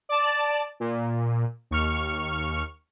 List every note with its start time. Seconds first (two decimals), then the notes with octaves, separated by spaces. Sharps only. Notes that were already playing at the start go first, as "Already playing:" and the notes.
0.09 D5 A5
0.80 A#2
1.71 D#2 C#6 F6